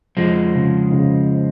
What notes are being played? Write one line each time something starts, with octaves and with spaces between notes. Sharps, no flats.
F2 F3 G#3
C#3
C#3